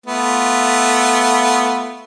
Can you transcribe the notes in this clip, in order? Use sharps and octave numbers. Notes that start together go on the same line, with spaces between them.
A3 B3 F4